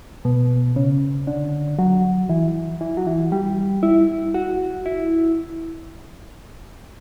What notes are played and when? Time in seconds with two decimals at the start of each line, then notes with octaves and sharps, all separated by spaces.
0.25 B2
0.76 C#3
1.27 D3
1.79 F#3
2.30 E3
2.81 E3
2.97 F#3
3.07 E3
3.32 G3
3.83 E4
4.34 F#4
4.86 E4